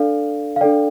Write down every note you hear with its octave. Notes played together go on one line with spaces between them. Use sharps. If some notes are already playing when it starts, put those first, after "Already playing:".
Already playing: D4 A4 D5 F5
F5
D4 A4 D5 G5